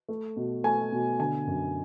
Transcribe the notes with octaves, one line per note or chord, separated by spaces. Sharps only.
A3
B2
A3 G#5
B2
D3 G#5
F#2